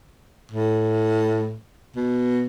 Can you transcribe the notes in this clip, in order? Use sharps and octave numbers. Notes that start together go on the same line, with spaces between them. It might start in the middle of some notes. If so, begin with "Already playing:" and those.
A2
B2